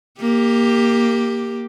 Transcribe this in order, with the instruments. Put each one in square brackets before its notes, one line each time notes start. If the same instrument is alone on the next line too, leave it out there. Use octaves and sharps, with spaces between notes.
[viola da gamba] A#3 G4